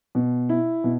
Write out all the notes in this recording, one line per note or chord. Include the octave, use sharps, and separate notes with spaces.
B2
E4
B2